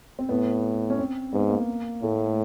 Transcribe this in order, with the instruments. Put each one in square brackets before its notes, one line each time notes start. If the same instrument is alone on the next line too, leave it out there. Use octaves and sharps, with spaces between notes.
[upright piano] C4
[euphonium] A2 [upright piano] B3
[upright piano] C#4
C4
[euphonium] G#2 [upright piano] B3
[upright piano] A#3
[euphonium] A2 [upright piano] A3